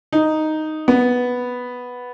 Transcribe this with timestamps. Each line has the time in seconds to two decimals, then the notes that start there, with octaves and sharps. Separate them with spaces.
0.13 D#4
0.88 B3